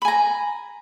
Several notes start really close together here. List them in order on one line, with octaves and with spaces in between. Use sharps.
B5 G#5 A#5